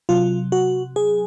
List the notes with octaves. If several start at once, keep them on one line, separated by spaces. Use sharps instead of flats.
C3 F#3 F4
F#4
G#4